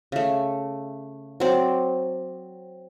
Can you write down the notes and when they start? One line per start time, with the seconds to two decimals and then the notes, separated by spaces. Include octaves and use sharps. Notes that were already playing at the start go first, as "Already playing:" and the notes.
0.12 C#3 A3
1.40 F#3 C4 D5